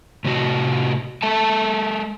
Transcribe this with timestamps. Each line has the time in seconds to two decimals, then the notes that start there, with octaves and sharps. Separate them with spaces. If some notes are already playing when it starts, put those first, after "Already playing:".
0.25 A2 C3 F#4
1.22 G#3 A4 E5 A5